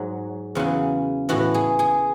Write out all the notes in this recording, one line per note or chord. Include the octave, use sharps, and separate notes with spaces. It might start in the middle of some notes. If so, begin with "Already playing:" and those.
Already playing: G#2 F#3
E2 C#3 F#3
A2 E3 F#4
G#4
G#4